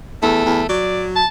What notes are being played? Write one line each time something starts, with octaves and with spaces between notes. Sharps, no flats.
E2 A3
E2
F#3 D5
A5